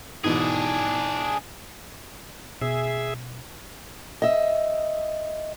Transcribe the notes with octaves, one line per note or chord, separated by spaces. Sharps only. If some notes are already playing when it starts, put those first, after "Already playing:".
G#2 B2 E3 D4 G#4
B2 G#4 E5
D#5 E5